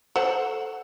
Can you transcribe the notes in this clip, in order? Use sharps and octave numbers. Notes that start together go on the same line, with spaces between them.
A4 C5 F#5